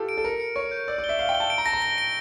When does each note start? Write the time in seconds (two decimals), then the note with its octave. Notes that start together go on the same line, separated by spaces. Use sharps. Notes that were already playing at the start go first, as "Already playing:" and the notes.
Already playing: F4 G4 A4
0.09 D7
0.17 A4
0.24 A#4 C#7
0.40 C#7
0.56 C#5 C#6
0.71 G6
0.88 D5 E6
0.98 D5
1.04 G7
1.09 E5
1.19 F5 G7
1.29 G5
1.35 G7
1.40 A5
1.50 D7
1.58 A#5
1.66 A5 A#6
1.73 A#5
1.82 A#6
1.98 D7